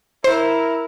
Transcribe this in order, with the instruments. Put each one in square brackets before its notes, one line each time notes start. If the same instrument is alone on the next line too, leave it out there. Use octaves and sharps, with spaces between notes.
[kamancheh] E4 A#4 [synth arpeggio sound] C5